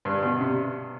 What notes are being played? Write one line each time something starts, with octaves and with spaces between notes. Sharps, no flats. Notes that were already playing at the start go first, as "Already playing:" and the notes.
G2
B2
C3